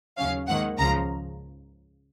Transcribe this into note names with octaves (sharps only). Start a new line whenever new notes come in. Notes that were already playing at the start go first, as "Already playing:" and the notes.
D#2 C#3 F#3 C#4 F5
G#2 D#3 A#3 F#5
C#2 C#3 F3 A#5